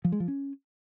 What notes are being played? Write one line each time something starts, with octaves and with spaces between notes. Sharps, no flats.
F3
G#3
F3
C#4